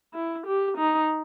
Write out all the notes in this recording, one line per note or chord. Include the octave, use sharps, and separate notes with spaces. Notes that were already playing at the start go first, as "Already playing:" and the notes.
E4
G4
D#4